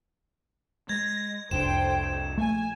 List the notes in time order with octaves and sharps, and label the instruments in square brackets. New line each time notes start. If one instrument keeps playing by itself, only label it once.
[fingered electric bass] G#3 [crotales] G#6 [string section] A#6
[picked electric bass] F1 [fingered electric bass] C2 D4 [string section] A4 C5 G5 [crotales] E7
[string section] A#1 G#5 [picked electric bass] A3